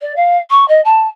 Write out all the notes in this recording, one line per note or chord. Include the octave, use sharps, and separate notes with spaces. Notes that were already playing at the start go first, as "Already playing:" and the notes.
D5
F5
C#6
D#5
A5